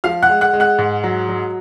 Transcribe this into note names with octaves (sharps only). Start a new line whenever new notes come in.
F3 F5 F6
F#5 F#6
G#3
F#5 F#6
G#3
F#5 F#6
G#2
F#3
F#3